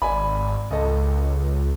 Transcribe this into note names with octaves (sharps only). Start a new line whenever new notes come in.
G#1 D5 G#5 B5
C#2 A4 D#5